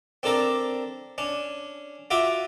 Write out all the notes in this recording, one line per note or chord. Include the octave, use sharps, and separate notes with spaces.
C4 D4 A4 A#4 D5
C#4 D4
F4 F#4 E5 D6